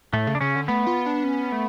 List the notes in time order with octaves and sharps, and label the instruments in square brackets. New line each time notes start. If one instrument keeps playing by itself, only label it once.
[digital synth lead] A2 [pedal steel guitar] A3
[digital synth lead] C#3
[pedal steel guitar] D4
[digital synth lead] C#3 [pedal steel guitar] C#4
[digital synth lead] D3
[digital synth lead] A3 [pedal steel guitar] B3
[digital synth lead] F4
D4
C#4
A3